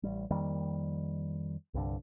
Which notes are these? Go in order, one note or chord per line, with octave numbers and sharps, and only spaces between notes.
A1 G3
F2 D#3 G3 A#3
C2 G2 D3